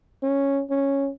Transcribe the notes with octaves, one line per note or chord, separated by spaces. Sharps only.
C#4
C#4